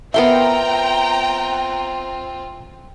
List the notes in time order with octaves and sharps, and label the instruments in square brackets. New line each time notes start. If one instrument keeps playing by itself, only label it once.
[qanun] B3 A#4 C6 [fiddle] C4 F4 [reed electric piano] E5 [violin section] G5 A#5